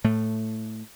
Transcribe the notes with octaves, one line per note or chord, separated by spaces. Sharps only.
A2 A3